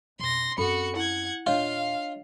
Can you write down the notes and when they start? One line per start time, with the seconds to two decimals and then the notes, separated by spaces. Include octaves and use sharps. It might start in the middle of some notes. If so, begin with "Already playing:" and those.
0.19 F2 B2 C6 A#6
0.58 F#2 C4 F#4 A4 B5 C#7
0.96 E4 F#5 G#6
1.47 D#2 A#2 D4 F4 C#5 D#5 F5